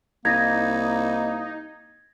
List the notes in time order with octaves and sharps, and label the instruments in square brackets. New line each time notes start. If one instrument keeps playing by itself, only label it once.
[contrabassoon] C2 [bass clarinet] A#3 [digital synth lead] D#4 [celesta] G#6 A#6